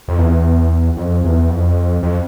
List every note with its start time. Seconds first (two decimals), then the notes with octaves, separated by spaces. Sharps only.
0.08 F2
0.18 E2
0.97 F2
1.24 E2
1.50 F2
2.03 F2